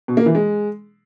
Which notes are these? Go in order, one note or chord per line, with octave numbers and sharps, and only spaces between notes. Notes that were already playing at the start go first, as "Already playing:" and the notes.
B2
A#3
E3
G#3